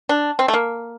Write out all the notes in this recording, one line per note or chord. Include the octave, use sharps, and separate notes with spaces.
D4
C4
A3
A#3